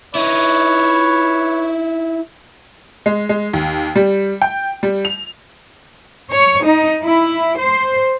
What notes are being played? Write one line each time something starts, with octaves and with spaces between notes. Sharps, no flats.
D#4 E4 B4 C#5
G#3
G#3
D#2
G3
G5
G3
F7
C#5
D#4
E4
C5